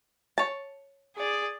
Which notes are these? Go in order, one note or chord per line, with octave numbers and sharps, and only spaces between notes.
C#5 A5
G#4 D5